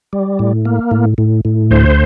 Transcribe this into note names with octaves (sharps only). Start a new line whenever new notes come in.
G3
A2
A#3
A2
A2
A2
D2 C5